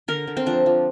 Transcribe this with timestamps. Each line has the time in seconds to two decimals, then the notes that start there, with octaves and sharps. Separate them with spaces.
0.08 D3 A#4
0.27 D3
0.37 C4
0.46 F3 D4
0.66 F3